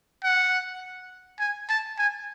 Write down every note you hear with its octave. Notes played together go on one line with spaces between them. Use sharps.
F#5
G#5
A5
G#5